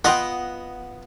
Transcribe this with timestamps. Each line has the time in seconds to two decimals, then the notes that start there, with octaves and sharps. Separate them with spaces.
0.05 B3 F4 D#5 F#5 G5